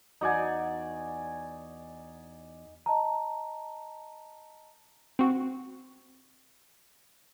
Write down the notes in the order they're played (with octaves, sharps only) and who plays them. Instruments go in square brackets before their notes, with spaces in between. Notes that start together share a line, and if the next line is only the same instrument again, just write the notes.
[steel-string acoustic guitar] E2 F#4 F#5 [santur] D#4 D5 G#5
[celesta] D#5 A5 A#5
[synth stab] C4 F#4